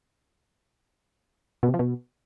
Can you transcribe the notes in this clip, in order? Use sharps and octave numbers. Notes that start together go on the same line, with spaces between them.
B2
C3
F3
B2